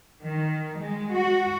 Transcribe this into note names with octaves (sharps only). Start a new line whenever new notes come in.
D#3
G#3
F#4